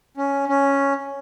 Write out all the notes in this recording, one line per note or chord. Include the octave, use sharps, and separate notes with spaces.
C#4
C#4